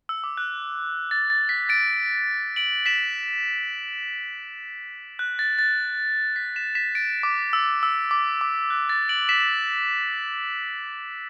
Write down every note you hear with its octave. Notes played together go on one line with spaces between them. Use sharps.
E6
D6
F#6
A6
A6
B6
A6 D7
D7 F#7
B6 E7
F#6
A6
A6
B6
B6 E7
B6 E7
A6 D7
D6
E6
E6
D6
D6
F#6
A6
D7 F#7
B6 E7
E7